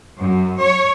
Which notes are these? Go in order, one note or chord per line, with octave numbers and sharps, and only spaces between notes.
F#2
C#5